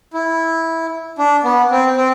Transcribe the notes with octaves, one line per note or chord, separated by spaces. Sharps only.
E4
D4
B3
C4
C4